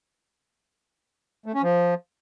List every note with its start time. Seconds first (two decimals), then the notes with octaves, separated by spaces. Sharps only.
1.46 A3
1.54 C#4
1.63 F3